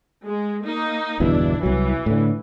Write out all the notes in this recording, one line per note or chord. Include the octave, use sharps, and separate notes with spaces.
G#3
A#3 D#4
G1 E2 B2 D4 E4
C2 E3 F#3
A2 D3